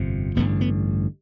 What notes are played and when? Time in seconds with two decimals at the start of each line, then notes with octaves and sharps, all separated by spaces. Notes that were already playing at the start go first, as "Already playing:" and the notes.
Already playing: G1 F2 C3
0.36 A1 G2 D3 B3
0.61 B3